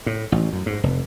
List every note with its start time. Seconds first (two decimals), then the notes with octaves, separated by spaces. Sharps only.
0.06 A2
0.32 A1
0.53 F#2
0.66 G#2
0.83 F1